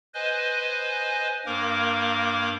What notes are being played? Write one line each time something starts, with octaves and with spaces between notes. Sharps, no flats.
B4 C5 D#5 G#5
G2 A#3 A#4 D6